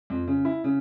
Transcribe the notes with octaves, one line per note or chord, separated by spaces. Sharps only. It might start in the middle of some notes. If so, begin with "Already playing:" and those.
F2
C#3
E4
C#3